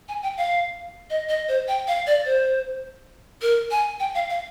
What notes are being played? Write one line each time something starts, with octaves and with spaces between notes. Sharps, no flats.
G#5
G5
F5
D#5
D#5
C5
G5
F5
D5
C5
A#4
G#5
G5
F5
F5